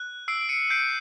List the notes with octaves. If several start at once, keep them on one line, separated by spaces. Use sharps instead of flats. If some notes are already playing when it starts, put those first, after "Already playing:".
Already playing: F#6
E6 C7 D7
D7
C#7 D#7
G6 C7 D7